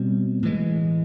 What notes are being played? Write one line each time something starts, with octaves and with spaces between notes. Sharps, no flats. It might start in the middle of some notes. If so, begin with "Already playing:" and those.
Already playing: B2 G3 C4
A2 E3 G#3